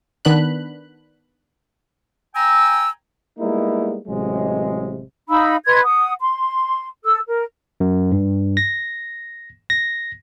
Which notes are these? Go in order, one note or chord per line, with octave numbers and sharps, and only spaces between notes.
D#3 B3 D4 B5 F#6
G5 G#5 A#5 E6
G3 G#3 A#3 B3 D#4 E4
A1 C3 F#3 G#3
D#4 F5 B5 E6
B4 D#5 C6 G#6
F#5 D#6
C6
A4 E6
A#4
F#2
G2
A#6
A#6